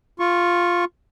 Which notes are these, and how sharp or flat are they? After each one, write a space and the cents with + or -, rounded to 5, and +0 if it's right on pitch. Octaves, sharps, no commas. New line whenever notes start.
F4 +0 C#6 -15